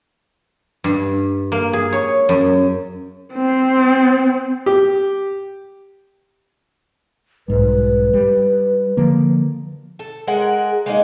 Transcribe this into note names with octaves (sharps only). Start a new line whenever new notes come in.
G2
A#3
G#4
C#5
F#2
C4
G4
B1 G#2 G3 B4
G3
D3 F3 A#3
A4
G#3 A#4 F#5
G#3 A#3 D#4